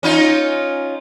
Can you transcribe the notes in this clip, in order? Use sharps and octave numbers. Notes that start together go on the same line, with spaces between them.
C#4 D#4 F4